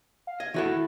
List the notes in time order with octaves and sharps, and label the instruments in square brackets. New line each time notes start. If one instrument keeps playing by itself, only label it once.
[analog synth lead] F5
[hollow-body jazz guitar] D#5 [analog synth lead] G#6
[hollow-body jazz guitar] D#3 F#4 A4 [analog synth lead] E4